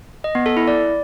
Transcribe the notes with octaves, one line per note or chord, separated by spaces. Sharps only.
D#5
B3
A4
E4
D5